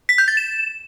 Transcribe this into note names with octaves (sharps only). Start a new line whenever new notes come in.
B6
G6
A6
E7